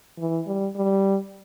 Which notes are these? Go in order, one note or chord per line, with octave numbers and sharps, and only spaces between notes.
E3
G3
G3